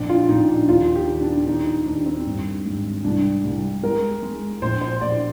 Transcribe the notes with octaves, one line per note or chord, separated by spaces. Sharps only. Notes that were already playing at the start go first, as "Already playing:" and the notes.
Already playing: A#1 F2 D4
F4
A#1 D#4
D4
D#2 F4
G4
D#3
D4
D#3 D#4
D#4
D#2 D4
C4
G2
G#1
C2 D4
C2
G#3 A#4
G#3
A#1 C5
C5
A#1 D5